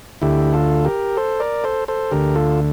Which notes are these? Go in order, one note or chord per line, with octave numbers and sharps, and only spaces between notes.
D2 D3 E4 G4
F4 A4
G4 A#4
A4 C5
A#4 D5
A4 C5
A4 C5
D2 D3 G4 A#4
F4 A4